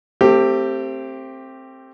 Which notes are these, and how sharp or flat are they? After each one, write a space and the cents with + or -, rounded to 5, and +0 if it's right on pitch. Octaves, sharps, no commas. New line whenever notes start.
A3 +35 C4 +15 G4 +0